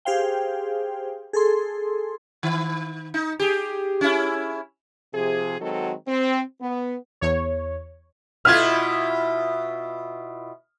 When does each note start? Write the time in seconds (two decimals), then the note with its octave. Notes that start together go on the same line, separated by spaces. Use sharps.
0.05 G4 G#4 C5 F5 G5
1.33 G#4 A4 C6
2.43 D#3
3.14 D#4
3.39 G4 G#4
4.01 C#4 E4
5.13 C3 F3 G#4
5.59 D#3 F#3 G#3 C4 F#4 A4
6.07 C4
6.61 B3
7.21 E2 C#5
8.45 B2 E4 F4 F6 G#6